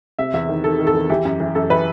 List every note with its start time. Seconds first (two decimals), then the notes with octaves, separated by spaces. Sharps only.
0.19 C3 E5
0.34 E2 E5
0.49 D#3
0.64 D#3 A4
0.79 D#3
0.87 A4
0.94 E2
1.10 E3 G4
1.25 F#2
1.40 E3
1.55 F#2 A4
1.70 E3 B4